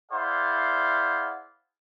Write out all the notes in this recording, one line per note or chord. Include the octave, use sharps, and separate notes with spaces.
E4 G#4 C5 D5 F5 F#5